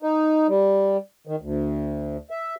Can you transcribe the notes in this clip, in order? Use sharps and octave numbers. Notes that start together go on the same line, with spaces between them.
D#4
G3
D#3
D2
E5